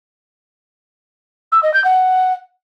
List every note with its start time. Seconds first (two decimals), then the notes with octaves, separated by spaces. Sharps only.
1.52 E6
1.63 D#5
1.73 G6
1.84 F#5